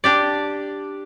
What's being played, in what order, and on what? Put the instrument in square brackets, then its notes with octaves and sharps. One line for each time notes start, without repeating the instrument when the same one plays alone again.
[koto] D4 G4 D5